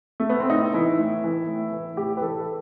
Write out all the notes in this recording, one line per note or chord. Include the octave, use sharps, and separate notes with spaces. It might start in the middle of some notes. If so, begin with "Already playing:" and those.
A3
B3
C4
A2 D#4
E3 E4
A2
E3
A2
E3
A2 G4
B4
E3 A4